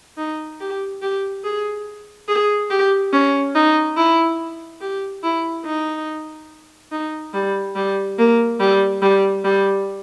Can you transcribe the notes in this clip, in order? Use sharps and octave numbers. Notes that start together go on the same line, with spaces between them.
D#4
G4
G4
G#4
G#4
G4
C#4
D#4
E4
G4
E4
D#4
D#4
G3
G3
A#3
G3
G3
G3